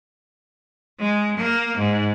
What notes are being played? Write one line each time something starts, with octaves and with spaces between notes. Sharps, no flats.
G#3
A#3
G#2